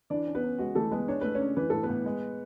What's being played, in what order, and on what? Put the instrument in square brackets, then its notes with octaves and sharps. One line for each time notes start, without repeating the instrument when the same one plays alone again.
[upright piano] E3 [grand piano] D4 D5
[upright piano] C#4
[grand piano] B3 B4
[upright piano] C#4
[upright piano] G#3 [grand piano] F#4
[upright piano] E3 [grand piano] A3 A4
[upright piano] G#3 [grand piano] B3 B4
[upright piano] D4 [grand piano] C#5
[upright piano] A3 [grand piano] B4
[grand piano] C#4 C#5
[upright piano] D4
[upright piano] E3 [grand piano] B4
[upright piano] A2 [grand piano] A4
[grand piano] B3 B4
[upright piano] A2
G#3